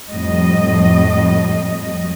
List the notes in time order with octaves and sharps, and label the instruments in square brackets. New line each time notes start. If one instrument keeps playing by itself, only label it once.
[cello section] F2 A2 G3 D#5